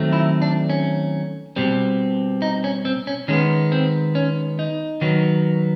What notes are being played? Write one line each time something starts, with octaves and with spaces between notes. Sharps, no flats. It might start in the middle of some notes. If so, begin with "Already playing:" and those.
Already playing: D#3 F#3 A3 C4
E4
D4
C#4
B2 G3 C4
D#4
C#4
C4
C#4
D#3 G#3 B3 C#4
C4
C#4
D#4
D#3 F#3 B3